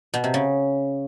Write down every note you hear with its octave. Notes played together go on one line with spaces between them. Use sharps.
B2
C3
C#3